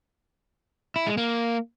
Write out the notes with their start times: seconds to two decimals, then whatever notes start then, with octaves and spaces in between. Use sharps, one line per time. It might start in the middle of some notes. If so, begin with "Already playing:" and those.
0.96 E4
1.07 G#3
1.17 A#3